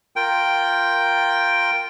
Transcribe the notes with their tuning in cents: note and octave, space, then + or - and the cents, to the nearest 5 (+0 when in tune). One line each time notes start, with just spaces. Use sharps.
F4 +0 A#4 +0 G5 +0